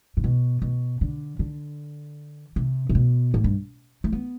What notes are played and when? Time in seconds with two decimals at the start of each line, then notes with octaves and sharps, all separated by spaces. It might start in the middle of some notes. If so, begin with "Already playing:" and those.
0.17 A2
0.24 B2
0.62 B2
1.01 D3
1.39 D3
2.56 C3
2.89 C3
2.95 B2
3.34 A2
3.44 G2
4.04 A3
4.12 B3